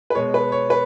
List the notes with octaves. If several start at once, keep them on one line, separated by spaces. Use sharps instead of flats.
B4
B2 G#3 C#5
B4
C#5
B4